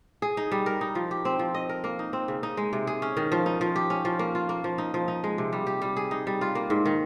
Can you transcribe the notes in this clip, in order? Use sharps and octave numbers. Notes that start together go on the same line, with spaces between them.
G#4
D#4
G3
A#4
D#4
F3
G4
C4
F3
D#5
A#4
A#3
D#4
C4
C#3
D#4
G#3
C3
G#4
C#4
D#3
F3
D#4
F3
G4
C#4
F3
A#3
F4
A#3
F3
D#4
F3
D#4
G#3
C3
G3
G4
G3
G#4
D#4
G3
F4
A#3
G#2
D#3